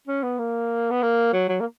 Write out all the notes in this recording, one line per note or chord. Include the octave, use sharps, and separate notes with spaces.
C#4
B3
A#3
B3
A#3
F#3
F#3
A#3